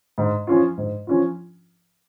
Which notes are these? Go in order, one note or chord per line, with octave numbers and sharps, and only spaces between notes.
G#2
F3 C#4 F4
G#2
F3 C#4 F4